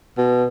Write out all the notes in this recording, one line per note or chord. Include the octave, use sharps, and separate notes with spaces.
B2